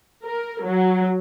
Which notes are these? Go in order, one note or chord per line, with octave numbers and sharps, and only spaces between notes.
A#4
F#3